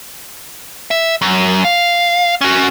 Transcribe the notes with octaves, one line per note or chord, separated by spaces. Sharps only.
E5
F#2
F5
C#4 F#4